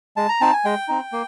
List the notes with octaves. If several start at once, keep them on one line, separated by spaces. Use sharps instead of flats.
G#3 A5
A#5
C4 D#4 A5
G#5
G#3 G5
C4 D#4
A#3